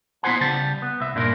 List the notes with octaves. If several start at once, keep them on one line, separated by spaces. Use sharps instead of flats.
B3 E4 F#4 C5 F#5 G#5
C#3 G3 G4 A5
B3
C2 E5
G2 A#2 D4 A#4